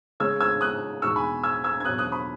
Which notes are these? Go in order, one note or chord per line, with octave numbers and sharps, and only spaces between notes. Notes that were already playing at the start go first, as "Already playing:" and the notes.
C#3 G#3 C#4 E6 G#6
E6 G#6
D#6 F#6
E2 B2 G#3 D#4 C#6 E6
G#5 B5
E6 G#6
E6 G#6
G#6
E2 B2 F#3 C#4 D#6 F#6
D#6 F#6
B5 D#6